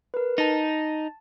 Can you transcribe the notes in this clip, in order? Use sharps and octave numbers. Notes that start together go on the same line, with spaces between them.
A#4 B4
D#4 A5 A6